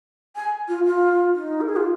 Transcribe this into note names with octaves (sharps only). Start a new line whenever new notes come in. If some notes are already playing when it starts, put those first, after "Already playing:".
G#5
F4
F4
D#4
A#4
G#4
F4